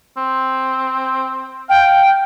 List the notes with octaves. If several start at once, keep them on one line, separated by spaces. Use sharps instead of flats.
C4
F5 G5